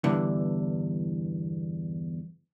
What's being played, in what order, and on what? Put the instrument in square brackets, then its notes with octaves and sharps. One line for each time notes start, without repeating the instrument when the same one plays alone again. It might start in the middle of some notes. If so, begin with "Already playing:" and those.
[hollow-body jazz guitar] E2 G2 D3 E3